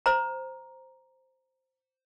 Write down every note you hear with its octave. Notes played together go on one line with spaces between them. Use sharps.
C5 A#5